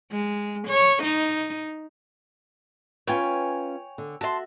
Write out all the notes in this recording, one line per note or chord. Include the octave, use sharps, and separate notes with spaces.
G#3
C#5
D#4
C#4 F4 B4 C#5 G5 G#5
D3
F#4 E5 A5 C6